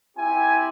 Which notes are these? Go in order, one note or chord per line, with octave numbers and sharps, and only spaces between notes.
C4 E4 G4 G#5